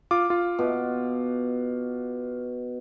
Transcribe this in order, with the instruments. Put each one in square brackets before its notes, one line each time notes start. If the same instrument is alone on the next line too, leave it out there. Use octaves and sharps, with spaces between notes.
[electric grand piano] F4 D6
F4
[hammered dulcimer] B2